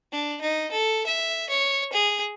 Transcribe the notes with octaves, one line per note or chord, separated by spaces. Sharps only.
D4
D#4
A4
E5
C#5
G#4